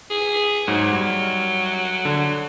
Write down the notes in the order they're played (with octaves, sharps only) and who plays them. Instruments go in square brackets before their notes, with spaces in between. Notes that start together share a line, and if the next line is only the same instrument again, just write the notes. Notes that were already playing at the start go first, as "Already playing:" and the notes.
[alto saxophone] G#4
[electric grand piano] G#2 [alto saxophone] F#3
[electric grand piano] G3
D3